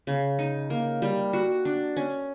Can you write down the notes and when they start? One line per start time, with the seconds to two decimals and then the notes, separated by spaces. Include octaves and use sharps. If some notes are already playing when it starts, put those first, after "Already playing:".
0.07 C#3
0.39 D#4
0.70 A#3
1.02 G3
1.33 F#4
1.65 D4
1.96 C#4